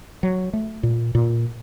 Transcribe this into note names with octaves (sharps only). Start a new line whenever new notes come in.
F#3
A3
A#2
A#2